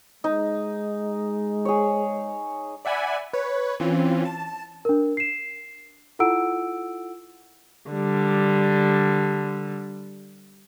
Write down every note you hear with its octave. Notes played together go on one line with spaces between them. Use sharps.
G#3 D#4
G#4 C#5
D5 E5 F#5 G#5 B5
B4 C#5
E3 C4 C#4 F4
A5
D4 A#4
C7 E7
E4 F4 A4 F#5 E6 D7
D3 G3